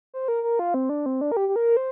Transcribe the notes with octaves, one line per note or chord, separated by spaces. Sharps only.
C5
A#4
A#4
F4
C4
D4
C4
D4
A#4
G4
G4
A#4
C5